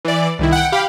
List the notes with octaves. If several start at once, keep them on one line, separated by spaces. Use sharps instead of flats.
E3 D5
C2 D#3 E4
F#5 G5
G4 F5 G5 B5